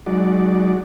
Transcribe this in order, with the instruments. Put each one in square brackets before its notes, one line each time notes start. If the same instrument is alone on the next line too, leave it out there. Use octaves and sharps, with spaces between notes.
[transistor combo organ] F#3 G#3 D#4 F#4 D5